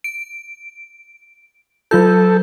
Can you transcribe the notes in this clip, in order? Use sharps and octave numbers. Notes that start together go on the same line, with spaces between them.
D7
F#3 F4 A4 G6